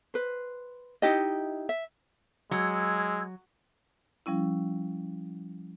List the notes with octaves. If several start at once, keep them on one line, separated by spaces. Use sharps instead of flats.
B4 C5
D#4 E4 G4 D#5
E5
F#3 G#3 E6 G#6
F3 G3 C#4 E4